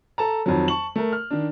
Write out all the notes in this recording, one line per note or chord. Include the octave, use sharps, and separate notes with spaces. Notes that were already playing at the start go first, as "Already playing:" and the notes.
A4 A5 A#5
F2 D#3 F#3
A5 C#6 F#7
A3 A#4
F6
D#3 D4